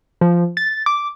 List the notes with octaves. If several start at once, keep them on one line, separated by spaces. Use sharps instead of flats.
F3
A6
D6